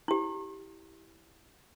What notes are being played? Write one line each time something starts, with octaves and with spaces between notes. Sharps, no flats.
E4 G4